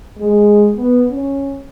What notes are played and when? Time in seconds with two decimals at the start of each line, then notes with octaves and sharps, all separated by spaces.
0.18 G#3
0.76 B3
1.11 C#4